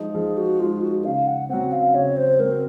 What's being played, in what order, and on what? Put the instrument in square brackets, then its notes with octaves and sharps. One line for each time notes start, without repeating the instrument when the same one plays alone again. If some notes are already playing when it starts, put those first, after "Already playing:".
Already playing: [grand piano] F3 G#3 D#4
[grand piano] F3 [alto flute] G#4
[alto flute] F#4
[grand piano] G#3 D#4 [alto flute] F4
[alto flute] F#4
[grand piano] C#3 [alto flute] F5
[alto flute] F#5
[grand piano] F#3 C4 [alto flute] F#5
[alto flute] F5
[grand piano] C#3 [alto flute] C#5
[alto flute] C5
[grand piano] F#3 C4 [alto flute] A#4